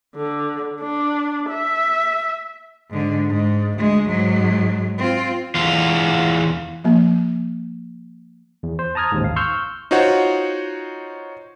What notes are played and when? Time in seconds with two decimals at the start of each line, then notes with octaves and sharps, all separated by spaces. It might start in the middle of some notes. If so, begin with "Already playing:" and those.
0.16 D3
0.81 D4
1.50 E5
2.90 G#2 D3
3.30 G#2
3.78 D2 G#3
4.08 G#2 F#3
4.98 C4 F4
5.55 E2 F4
6.84 F3 A#3
8.63 E2
8.79 C5
8.95 A5 A#5 D#6 F6 G#6
9.12 A1 D#2 G#2
9.24 F5
9.36 C6 C#6 E6 F6 G6
9.91 D#4 F4 F#4 C5 C#5 F#5